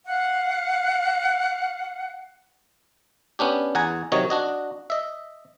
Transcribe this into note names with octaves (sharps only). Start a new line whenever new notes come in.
F5 F#5
B3 C#4 D4 G4
E2 F#5 G#5 A#5
C3 D#3 F#3 C#5 D#5
D4 F#4 D#5
D#5 E5